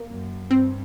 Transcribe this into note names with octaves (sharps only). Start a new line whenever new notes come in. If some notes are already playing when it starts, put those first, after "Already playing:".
Already playing: A#3
F#2
G2 C4